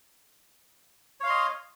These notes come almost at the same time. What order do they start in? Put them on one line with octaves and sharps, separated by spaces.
C#5 F5 C6 D#5